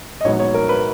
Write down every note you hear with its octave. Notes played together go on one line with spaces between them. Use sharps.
D#5
A#1 G#2 F#3 B3 C#5
C#5
A#4
B4